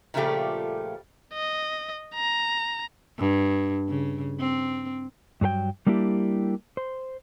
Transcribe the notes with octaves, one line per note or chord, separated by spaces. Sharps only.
A#2 C#3 F3 G3 A3 G4
D#5
A#5
G2
C#3
C4
G2 F#3 G#4 G5
G3 A#3 D4 E4 G4
C5